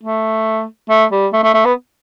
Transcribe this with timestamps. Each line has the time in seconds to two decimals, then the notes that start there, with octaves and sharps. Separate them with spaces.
0.03 A3
0.90 A3
1.12 G3
1.33 A3
1.44 A3
1.54 A3
1.65 B3